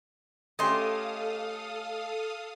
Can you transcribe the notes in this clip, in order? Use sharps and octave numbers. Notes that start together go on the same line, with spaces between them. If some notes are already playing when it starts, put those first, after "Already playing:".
A3 C#4 G4 A4 D#5 F5 C6 D#6